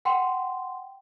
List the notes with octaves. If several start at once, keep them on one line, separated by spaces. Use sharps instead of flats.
F#5 G5 C6